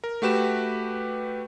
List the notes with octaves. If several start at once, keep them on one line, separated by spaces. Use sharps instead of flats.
A#4
A3 F#4 G4 B4 E7